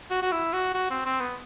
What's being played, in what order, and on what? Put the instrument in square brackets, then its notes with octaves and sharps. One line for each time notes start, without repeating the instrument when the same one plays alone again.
[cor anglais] F#4
F#4
E4
F#4
F#4
C4
C4
B3